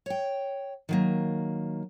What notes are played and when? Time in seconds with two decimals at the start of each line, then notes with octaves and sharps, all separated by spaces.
0.06 C#5 G5
0.89 D#3 F#3 A#3